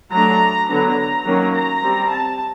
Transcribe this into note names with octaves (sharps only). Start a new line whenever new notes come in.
F#3 A3 D4 A#5
D3 F#3 B3 D4 A#5
D#3 F#3 A#3 C#4
A#5
G3 C4
A5